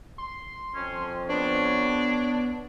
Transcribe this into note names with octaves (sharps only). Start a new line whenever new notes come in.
C6
F2 C#4
B3 D4 C#5